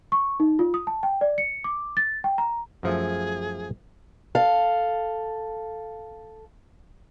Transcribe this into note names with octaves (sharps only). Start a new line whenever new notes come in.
C#6
D#4
F4
D#6
A5
G5
D5
C#7
D6
A6
G5
A#5
F#2 F3 A3 G#4
A4 F5